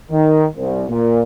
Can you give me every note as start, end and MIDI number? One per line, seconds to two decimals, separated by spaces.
0.11 0.46 51
0.56 0.84 36
0.89 1.22 46